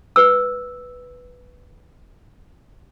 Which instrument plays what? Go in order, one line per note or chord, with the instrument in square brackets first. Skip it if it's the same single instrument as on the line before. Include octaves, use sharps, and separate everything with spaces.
[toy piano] B4 E6